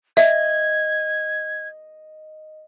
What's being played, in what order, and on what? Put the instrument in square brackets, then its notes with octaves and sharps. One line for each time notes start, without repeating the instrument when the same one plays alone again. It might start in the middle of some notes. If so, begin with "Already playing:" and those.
[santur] D#5 [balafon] E5 [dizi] G#6